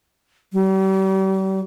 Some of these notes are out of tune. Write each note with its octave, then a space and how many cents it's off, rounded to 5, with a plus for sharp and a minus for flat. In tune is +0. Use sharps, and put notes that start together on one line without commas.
G3 -40